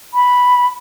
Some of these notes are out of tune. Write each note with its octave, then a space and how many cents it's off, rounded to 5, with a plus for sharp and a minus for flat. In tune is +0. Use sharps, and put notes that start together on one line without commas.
B5 -5